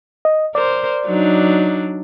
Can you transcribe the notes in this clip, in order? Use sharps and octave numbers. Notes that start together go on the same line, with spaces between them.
D#5
A#4 C5 D5
F#3 D4 D#4